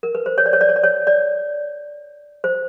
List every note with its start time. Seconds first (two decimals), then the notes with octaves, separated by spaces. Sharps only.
0.03 A#4
0.15 B4
0.26 C5
0.38 C#5
0.46 D5
0.53 C#5
0.61 D5
0.69 C#5
0.76 D5
0.84 C#5
1.07 D5
2.44 C5